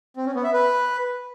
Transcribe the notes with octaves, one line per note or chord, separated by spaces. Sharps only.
C4
C#4
B3
E5
B4